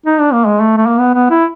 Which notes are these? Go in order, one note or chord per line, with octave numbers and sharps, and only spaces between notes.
D#4
D4
A#3
G#3
A3
A3
A#3
B3
B3
E4